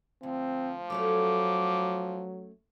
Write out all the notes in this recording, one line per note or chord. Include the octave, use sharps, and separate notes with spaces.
D2 F3 C4
F#3 A3 C#4 A4 D6